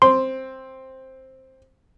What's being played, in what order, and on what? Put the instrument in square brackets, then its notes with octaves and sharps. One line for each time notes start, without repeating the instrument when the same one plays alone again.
[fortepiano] C4 [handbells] C6